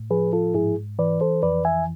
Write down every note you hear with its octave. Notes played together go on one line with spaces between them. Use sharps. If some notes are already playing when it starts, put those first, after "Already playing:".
Already playing: A2
F3 G#4 B4
F4 A4
G#2 E4 G#4
E3 B4 D5
A4 C5
F2 B4 D5
E5 G#5